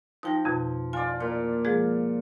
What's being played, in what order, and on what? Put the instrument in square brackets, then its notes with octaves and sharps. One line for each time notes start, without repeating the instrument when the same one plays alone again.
[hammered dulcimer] F3 [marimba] D#4 G5 A#6
[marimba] F2 B2
[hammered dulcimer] F4 D5 [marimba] G#5
[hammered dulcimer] A#2
[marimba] F3 G#3 G#4